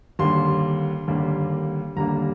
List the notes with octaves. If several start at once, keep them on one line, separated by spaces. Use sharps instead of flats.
D#2 D3 G3 A#3 C6
D#2 D3 G3 A#3
D#2 D3 G3 A#3 A#5